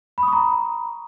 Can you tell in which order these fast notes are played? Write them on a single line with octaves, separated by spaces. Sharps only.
B5 D#6 C#6 A#5